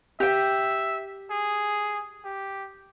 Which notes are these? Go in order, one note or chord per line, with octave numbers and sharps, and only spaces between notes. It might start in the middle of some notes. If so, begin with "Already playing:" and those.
G4 E5 G5
G#4
G4